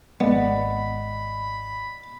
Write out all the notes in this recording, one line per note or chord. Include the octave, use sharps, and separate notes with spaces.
G#1 G#3 B3 D5 D#5 F#5 B5